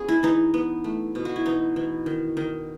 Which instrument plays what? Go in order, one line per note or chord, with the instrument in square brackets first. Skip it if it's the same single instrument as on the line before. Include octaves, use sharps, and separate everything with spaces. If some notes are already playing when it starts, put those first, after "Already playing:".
Already playing: [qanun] B3 C#4 G#4
E4
E3 D#4
B3
A3
B2
F#4
E4
E3 D#4
E3
D#3
D#3